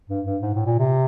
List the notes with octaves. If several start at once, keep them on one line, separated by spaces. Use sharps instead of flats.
G2
G2
G#2
A2
A#2
C3